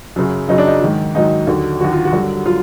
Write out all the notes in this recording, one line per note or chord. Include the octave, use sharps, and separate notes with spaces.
F#2 C#3 F#3
F#2 C#3 F#3 D#4
D4
D#4
G#2 D#3 F#3
G#2 D#3 F#3 D#4
D#2 D3 F#3
D#2 D3 F#3 F#4
F4
F#4
G2 D3 F#3
F#3 F4